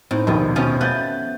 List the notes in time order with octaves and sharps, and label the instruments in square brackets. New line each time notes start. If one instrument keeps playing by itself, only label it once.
[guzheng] A2 [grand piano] C4 D#4
[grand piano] A#1 D#2 D#3 [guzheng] B2 F3
[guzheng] B2 F3 C#4
[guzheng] A3 B3 [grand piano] F#6 G6 A6